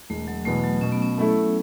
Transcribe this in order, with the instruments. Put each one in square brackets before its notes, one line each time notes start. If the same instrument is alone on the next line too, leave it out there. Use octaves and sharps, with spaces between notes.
[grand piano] E1 [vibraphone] A3
[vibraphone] F#3
[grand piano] E2 B2 B3 [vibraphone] A3
[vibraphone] F#3
[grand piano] B2 [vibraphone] C#4
[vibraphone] B3
C#4
[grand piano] A3 E4 A4